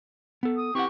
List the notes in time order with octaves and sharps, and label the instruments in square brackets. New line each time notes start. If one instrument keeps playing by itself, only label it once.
[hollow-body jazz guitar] B3 A4
[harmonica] D#6
[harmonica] E3 G4 C#6 [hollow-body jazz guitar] C4 F#5